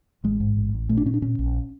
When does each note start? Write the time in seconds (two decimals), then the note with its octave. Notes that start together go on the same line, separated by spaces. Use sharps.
0.24 A1 G#3
0.40 G#2
0.57 A1
0.73 A1
0.89 A#2 A3
0.97 D4
1.05 A#2 C#4
1.14 D4
1.22 A#2 C#4
1.39 A#1